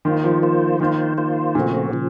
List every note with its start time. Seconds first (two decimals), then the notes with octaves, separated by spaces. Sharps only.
0.05 D#3 A#3 F4 C5
0.24 F3
0.42 A#3 F4 C5
0.80 D#3 A#3 F4 C5
1.18 A#3 F4 C5
1.55 A#2 C#3 F3 A3 C4 F#4
1.93 C#3 F3